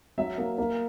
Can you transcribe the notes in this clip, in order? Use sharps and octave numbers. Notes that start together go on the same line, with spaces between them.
F#3 E5
A#3
A#3